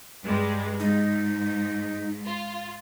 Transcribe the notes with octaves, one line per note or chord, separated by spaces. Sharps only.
G2 G3 G#3
G#2 D#4
F4